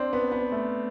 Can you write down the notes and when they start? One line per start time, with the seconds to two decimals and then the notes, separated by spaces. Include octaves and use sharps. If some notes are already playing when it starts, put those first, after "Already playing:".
Already playing: C4 D4
0.13 B3
0.32 B3
0.52 A3